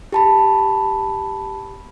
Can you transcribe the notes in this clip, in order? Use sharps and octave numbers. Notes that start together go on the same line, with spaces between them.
G4 A5 B5